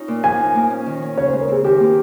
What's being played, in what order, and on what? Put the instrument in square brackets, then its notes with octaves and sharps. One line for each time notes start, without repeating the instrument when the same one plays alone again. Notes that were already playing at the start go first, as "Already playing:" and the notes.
Already playing: [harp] C#4 D#4 F4
A#2
[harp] F3 [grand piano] G#5
[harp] D#4
A#3
C#4
D#3
C#4
[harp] C#3 [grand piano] C#5
[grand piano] C5
[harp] G#3
[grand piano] A#4
[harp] C4 [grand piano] G#4
[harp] D#3 [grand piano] G4
[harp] A#3